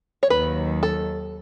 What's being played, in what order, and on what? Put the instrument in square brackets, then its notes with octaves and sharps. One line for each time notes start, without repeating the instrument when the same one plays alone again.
[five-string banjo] C#5
[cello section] D#2 D#3 F#3 [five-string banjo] B4
[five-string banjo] A4